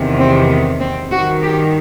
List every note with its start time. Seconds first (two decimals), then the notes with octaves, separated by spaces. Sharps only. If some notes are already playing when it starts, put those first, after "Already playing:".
Already playing: E2 C3 D#3
0.19 C4
0.50 B3
0.80 C4
1.11 G2 D#3 F#4
1.42 G4